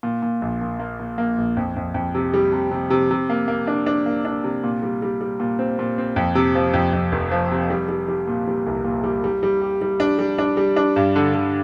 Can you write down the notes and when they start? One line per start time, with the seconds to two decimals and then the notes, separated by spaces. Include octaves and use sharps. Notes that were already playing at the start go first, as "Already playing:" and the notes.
0.03 A#2
0.22 A#2
0.41 A#1
0.61 A#2
0.79 A#3
1.00 A#2
1.18 A#3
1.38 A#1
1.57 F2
1.76 F2
1.94 F2
2.15 C3
2.34 G3
2.52 C3
2.71 C3
2.90 C3
3.11 C3
3.30 A#3
3.48 A#3
3.67 D4
3.86 D4
4.06 A#3
4.25 D4
4.44 C3
4.64 A#2
4.82 G3
5.02 G3
5.21 G3
5.40 A#2
5.59 C4
5.79 A#2
5.98 C4
6.16 F2
6.35 C3
6.55 F3
6.74 F2
6.93 F2
7.12 F1
7.31 F3
7.51 C3
7.70 G3
7.89 G3
8.08 G3
8.27 A#2
8.47 G3
8.66 C2
8.85 A#2
9.04 G3
9.24 G3
9.43 G3
9.61 G4
9.82 G3
10.00 D4
10.19 G3
10.38 D4
10.57 G3
10.76 D4
10.96 G2
11.16 D3
11.34 D3